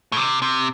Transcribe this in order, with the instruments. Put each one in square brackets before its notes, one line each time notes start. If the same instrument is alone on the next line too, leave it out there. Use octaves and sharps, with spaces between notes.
[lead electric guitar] A2
C3
C3